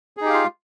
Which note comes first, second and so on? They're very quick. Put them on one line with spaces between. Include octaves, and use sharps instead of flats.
G#4 D#4 G4 F5 F4